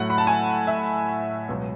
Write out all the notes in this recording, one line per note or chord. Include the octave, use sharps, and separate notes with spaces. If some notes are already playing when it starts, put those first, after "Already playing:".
Already playing: A2 F#3 A3 F#5
B5
A5
G#5
E5
C#2 B2 F#3